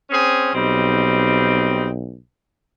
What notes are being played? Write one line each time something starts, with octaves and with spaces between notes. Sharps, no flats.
C4 C#4 G#4
B1 G3 C4 D#4